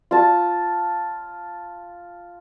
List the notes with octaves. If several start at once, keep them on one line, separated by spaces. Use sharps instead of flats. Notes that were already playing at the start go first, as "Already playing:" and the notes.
F4 A5